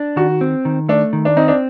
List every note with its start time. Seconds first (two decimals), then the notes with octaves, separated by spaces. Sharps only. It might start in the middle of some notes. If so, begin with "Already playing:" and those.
Already playing: D4
0.16 D#3 F#4
0.41 C4
0.65 D#3
0.89 A3 D4
1.13 D#3
1.25 D4
1.37 C4 D#4
1.48 D4